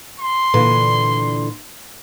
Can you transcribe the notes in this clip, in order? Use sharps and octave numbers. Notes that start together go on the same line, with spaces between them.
C6
A#2 D3 E3